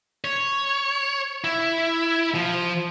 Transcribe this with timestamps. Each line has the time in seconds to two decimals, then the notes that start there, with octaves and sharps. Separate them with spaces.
0.24 C#5
1.44 E4
2.35 F3